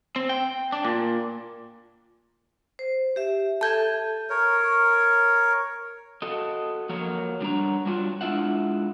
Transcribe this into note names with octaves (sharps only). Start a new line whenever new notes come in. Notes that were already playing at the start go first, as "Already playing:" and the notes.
C4
G5
D4
A#2
C5
G4 E5
A4 E5 A5 G6 G#6
A#4 C#5
F#4 A4 D#5
F3 F#3 A#3 A#4 C#5
F#3 G3 D4 F#4 C#5 A#5
F#3 G3 D4 F4 F#4
G#3 D4 E4 F4 E5 F#5